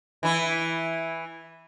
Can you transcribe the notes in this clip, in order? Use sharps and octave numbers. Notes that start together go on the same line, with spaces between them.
E3 E4